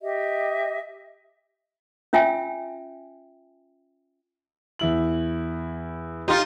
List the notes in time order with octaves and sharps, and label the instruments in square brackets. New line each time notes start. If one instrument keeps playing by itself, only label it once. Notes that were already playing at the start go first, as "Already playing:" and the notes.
[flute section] G4 D#5 E5
[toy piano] C#4 F4 E5 G5 G#5
[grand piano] E2 E4 F#7
[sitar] D#4 F4 [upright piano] G4 A#5 C6